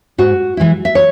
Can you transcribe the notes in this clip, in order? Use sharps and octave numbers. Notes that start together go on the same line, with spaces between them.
G#2 F#4
E3 G#3 E4
E5
C#5